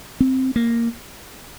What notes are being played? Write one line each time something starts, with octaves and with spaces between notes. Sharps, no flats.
C4
A#3